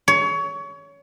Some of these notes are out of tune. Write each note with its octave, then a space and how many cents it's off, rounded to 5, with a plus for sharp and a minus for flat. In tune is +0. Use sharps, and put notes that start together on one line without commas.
C#5 +25